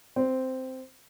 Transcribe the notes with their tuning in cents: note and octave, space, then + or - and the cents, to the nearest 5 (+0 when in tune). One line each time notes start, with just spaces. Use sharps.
C4 -5